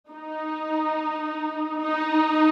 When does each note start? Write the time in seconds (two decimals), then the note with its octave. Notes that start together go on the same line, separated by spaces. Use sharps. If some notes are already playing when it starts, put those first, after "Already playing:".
0.11 D#4
1.82 D#4